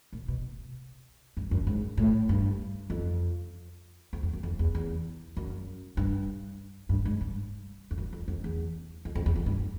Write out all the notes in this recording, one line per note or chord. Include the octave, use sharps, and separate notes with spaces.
A#2
B2
G2
F#2
G#2
A2
G2
F2
F2
F2
F#2
F2
E2
E2
F#2
G2
G2
G#2
G2
F2
F#2
F2
F2
E2
F2
F2
E2
F2
G2